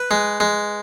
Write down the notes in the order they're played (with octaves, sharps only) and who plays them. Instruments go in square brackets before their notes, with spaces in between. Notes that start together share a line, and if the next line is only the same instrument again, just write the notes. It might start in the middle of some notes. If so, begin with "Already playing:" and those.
Already playing: [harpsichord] B4
G#3
G#3